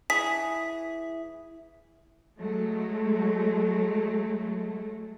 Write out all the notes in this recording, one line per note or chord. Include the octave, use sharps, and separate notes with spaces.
E3 G#4 B6
F#3 G#3 A3